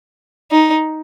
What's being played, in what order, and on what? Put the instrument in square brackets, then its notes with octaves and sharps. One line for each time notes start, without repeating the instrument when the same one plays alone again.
[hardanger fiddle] D#4